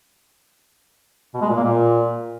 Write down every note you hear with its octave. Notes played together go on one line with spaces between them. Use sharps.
B2
G#3
A#2
A#3
A#2